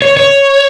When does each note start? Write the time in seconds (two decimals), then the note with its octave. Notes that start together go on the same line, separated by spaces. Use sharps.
0.02 C#5
0.17 C#5